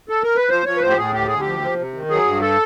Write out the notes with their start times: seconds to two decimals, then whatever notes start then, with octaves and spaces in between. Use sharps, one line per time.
0.09 A4
0.23 A#4
0.36 B4
0.49 F3 C5
0.65 F3 C#5
0.76 B4
0.82 A2 C5
0.90 G4
0.97 A2 G#4
1.14 D2 G4
1.28 D2 G#4
1.40 G4
1.46 F3
1.62 F3
1.78 C3
1.94 D#3
2.10 F#3 G#4
2.26 G2
2.41 A4